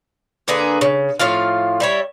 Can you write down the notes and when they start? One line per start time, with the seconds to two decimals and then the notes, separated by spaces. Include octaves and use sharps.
0.48 D3 A#3 G#4 B4
0.81 C#3
1.19 A2 F3 F4 F5
1.80 G3 E4 C#5